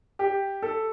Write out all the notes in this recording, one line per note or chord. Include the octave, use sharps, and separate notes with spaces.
G4
A4